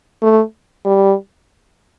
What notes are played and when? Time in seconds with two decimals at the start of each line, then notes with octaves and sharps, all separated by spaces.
0.22 A3
0.85 G3